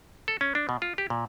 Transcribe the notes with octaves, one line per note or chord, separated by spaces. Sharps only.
A4
C#4
D4
B2
F4
G4
A#2